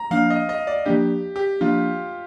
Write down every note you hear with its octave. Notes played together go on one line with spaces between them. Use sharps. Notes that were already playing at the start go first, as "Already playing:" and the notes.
Already playing: A#5
F3 A#3 D4 F5
D#5
D#5
D5
F3 A#3 D4 G4
G4
F3 A#3 D4 F4